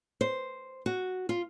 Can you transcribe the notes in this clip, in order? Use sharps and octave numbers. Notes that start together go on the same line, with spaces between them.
C5
F#4
F4